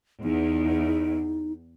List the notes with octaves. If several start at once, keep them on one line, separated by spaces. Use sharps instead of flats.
E2 D#4